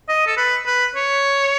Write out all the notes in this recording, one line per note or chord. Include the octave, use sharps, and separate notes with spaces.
D#5
A4
B4
B4
C#5